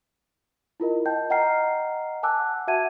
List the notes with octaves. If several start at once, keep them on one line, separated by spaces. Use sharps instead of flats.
E4 F4 A#4 D#5
D#5 G5 A5 G6
D#5 F#5 G5 A#5 F6 C7
F#5 G#5 A5 D6 E6 F#6
F#4 E5 F#5 A5 G#6 D#7